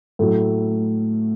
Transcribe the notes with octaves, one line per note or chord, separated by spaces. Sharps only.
A2 F#3 A3